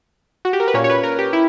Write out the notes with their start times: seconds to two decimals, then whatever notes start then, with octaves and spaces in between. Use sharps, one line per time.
0.45 F#4
0.53 G4
0.60 A#4
0.68 B4
0.74 A#2 A#3 C#4 C#5
0.84 C#5
0.90 B4
1.03 A#4
1.19 G4
1.33 E4